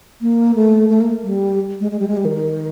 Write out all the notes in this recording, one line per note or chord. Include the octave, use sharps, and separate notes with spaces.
A#3
A3
A3
A#3
G3
G#3
G#3
G3
G#3
G3
D#3